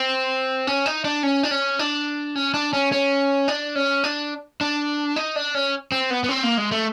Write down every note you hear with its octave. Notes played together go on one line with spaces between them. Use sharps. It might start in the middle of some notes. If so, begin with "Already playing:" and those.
Already playing: C4
C#4
D#4
D4
C#4
D4
C#4
D4
C#4
D4
C#4
C#4
D4
C#4
D4
D4
D#4
D4
C#4
C4
B3
B3
C4
A#3
G#3
A3